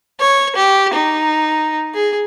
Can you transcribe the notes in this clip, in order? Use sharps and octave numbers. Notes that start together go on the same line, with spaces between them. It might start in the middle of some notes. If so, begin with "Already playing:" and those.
C#5
G4
D#4
G#4